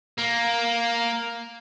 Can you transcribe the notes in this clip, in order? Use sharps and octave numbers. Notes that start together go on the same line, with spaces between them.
A#3